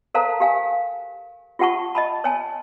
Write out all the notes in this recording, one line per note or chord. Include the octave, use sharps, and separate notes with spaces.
A4 A#4 C5 F5 A5 A#5
G4 F5 G#5
F4 G4 F#5 A5 C#6
D#5 A5 B5
C#5 G#5 A5